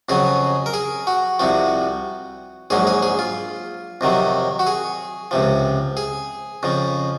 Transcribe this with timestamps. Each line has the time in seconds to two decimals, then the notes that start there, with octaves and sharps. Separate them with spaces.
0.09 F2 C#3 F#3 G#4
0.66 A#4
0.74 G#4
1.07 F#4
1.39 C2 C3 F3 F#4
2.70 A#1 G#2 F#3 G#4
2.87 G#4
3.02 G#4
3.19 F4
4.01 F2 C3 D#3 F#3
4.59 F#4
4.67 G#4
5.31 C#2 C3 F3
5.97 G#4
6.63 F2 C#3 F3